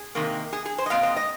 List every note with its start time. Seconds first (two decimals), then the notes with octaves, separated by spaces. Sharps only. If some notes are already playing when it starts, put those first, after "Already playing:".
Already playing: G#4
0.15 C3 D#3 A#3
0.53 G#4
0.65 G#4
0.78 C5
0.86 D#5
0.90 A#2 G#3 C4 F5
1.03 D#5
1.16 D#5